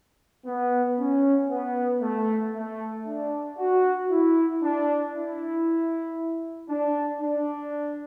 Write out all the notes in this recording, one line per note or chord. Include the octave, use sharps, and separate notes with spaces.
B3
C#4
B3
A3
A3
D4
F#4
E4
D4
E4
D4
D4